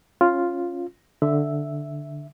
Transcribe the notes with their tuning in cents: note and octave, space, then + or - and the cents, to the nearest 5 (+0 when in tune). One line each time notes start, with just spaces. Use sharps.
C#4 -10 F4 +0
D3 +0 E5 +0